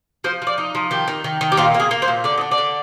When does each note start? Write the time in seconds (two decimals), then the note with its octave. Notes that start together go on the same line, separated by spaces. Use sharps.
0.24 F3 C5
0.42 F3 D5
0.58 D#4
0.75 F3
0.91 D#3 G4
1.08 D#3
1.24 D#3
1.41 D#3
1.52 G4
1.57 A#2 F4
1.74 A#3
1.80 G#4
1.91 A#3
2.02 C5
2.08 A#2
2.24 D3 D5
2.38 D#5
2.41 D4
2.51 D5
2.58 D3